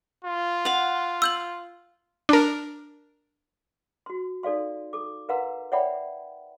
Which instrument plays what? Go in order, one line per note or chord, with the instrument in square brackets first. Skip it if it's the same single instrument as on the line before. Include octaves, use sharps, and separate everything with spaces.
[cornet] F4
[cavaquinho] F5 F#5
[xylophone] E6 G6 F#7
[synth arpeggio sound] D4 A#4
[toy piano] F#4 C6
D#4 A4 D5 F5 C6
A4 D6
A#4 B4 F5 F#5 A#5 C6
C#5 D5 E5 F#5 G5 B5